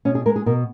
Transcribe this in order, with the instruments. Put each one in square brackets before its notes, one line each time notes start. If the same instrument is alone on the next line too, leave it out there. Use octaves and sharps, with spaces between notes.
[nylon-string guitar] B2 C#4
G#4
G#3 A#4
G#4
B2 A#4